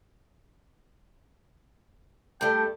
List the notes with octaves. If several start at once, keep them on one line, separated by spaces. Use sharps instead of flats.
G2 A3 G5